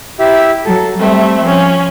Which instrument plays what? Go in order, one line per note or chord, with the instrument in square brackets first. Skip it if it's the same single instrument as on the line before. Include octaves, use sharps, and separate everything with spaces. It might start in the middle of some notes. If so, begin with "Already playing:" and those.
[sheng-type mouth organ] E4 G4 E5
[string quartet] F#3 [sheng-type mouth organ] A4
[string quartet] G3 A3 E5 [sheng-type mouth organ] C4
[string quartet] F3 C#4